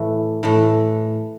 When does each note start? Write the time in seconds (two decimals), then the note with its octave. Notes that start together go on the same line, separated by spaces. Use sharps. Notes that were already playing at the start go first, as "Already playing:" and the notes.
Already playing: A2 E3 A3
0.43 A2 E3 A3